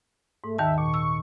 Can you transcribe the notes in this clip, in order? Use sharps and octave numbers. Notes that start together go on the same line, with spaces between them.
G#2 A3
D#2 D#3 E5 A5
A#2 C#6
E6